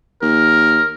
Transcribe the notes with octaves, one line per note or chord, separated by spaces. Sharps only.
D#2 A#4